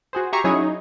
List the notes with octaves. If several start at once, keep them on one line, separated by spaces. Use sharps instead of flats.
F#4 G#4 C5
G4 E5 G#5 A#5 C#6 C7
F#3 C#4 D#4 E4 G#4 C#5
D#4